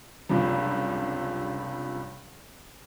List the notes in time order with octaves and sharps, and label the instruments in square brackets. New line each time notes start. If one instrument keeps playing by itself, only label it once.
[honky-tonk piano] F#1 C#2 G2 C3 F3